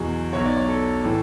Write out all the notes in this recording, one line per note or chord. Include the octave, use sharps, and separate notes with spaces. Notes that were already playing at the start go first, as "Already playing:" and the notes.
Already playing: E2 B2 F#3 G#4
B1 B2 F#3 C#5
D5
C#5
A4
A2 E3